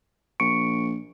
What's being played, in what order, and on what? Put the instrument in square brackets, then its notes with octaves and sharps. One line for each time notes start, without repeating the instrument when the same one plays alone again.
[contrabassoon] A#1 [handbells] C#6 C#7 D7